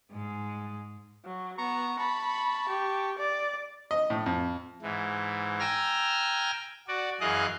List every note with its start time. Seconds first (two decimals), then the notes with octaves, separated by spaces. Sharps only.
0.12 G#2 G#3
1.25 F#3
1.58 B3 A#5 C#6
1.99 A5 B5 C#6
2.69 G4
3.18 D5
3.91 D#5
4.10 A2
4.26 F2
4.82 G#2 E3
5.60 G5 G#5 A#5 E6 F6
6.88 F#4 D5
7.21 F#2 E3 G#4 D#5 F5 F#6